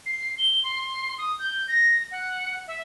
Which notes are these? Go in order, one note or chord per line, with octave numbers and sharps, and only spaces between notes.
C7
G7
C6
D#6
G6
A#6
F#5
E5